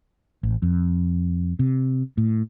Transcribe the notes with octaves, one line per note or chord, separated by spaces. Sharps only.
A1
F2
C3
A2